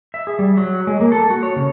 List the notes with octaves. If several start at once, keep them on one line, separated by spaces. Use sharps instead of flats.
E5
G#4
G3
F#3
G#3
A#3
A4
F#4
C#5
C#3